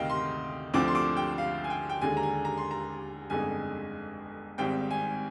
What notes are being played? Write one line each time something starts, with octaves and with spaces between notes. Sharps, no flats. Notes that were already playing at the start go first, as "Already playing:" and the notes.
Already playing: D2 C3 D#3 D#5 F5 G5
C6
D2 D3 F3 C4 D6
C6
D6
G5
F5
G#5
G5
G5
D#2 D3 G#3 G#5
A#5
G#5
A#5
C6
A#5
G1 F2 D3 G#3 D#4 G#5
G#1 G#2 G3 C4 G5
G#5